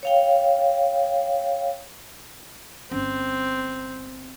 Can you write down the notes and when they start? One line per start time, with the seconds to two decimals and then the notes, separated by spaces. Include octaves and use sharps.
0.03 C#5 F5 G5
2.91 G1 C4 C#4